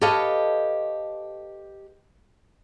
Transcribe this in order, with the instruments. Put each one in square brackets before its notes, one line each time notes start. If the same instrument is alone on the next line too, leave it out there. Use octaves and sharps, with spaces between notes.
[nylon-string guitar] G4 A4 B4 C#5 D#5 F5